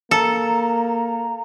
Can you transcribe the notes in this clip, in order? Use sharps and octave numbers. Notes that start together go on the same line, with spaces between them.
A#3 A4 A#5